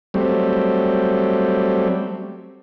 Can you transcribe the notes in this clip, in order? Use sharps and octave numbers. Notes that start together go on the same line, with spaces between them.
F#3 G3 A3 C4